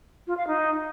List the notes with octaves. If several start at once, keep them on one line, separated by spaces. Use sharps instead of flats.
F4
F5
D#4